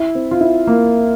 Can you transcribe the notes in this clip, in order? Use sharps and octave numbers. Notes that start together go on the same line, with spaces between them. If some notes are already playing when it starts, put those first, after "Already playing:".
Already playing: E4
C4
F4
E4
A#3